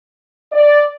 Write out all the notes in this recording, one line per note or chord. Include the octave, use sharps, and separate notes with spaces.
D5